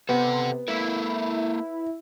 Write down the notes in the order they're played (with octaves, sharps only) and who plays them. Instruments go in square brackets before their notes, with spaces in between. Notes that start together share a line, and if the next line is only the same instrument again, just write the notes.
[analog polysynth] C3 [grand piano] B3 [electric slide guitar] A4 F#5
[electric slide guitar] A#3 A4 A#4 [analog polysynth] E4